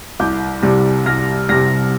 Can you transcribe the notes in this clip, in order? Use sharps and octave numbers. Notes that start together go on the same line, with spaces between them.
C2 D6 G6
C3 G3
C2 F6 A#6
C3 G3 F6 A#6